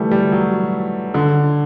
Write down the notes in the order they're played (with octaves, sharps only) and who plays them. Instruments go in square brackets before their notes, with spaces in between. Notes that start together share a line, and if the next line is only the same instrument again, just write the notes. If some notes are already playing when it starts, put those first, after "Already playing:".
Already playing: [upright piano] E3 G3 A3
G3
F#3
D3